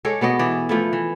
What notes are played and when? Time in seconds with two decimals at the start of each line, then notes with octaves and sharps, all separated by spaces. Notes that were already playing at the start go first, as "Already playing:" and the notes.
0.05 G#3 A4 C#5 D5
0.21 B2 B3 D5 D#5
0.39 E3 D5
0.69 F3 A3 E4
0.93 E3